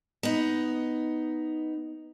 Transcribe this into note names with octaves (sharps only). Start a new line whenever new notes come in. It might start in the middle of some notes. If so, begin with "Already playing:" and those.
B3 D#4